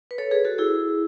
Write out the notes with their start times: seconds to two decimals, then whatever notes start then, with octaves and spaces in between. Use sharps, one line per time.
0.11 B4
0.18 A4 C#5
0.31 G#4 B4
0.45 F#4 A4
0.58 E4 G#4